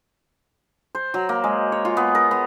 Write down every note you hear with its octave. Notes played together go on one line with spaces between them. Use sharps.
C5
F#3
A#3
G#3
C#5
F4
B3
A#4
B3